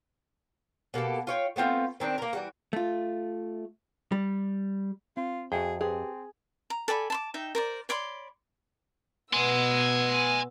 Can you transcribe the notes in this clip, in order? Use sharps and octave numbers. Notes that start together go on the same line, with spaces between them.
B2 A#3 G4 A4
F4 C#5 G5
A3 B3 C4 F4
D#3 C4 D4
A#3 A#4
E3 G3 F#4
A3 F4
G3
C4 F4
F2 F#4 G#4 E5 G5
C4 G4 G#4 B4
A#5
A4 D5 G#5 B5
A5 C6 D6
D#4 E5 G5
A#4 C5 D5
C#5 D5 B5 C6
B2 B3 G#5 C6 E6